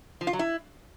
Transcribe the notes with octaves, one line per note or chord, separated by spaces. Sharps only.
F3
F4
F#3
E4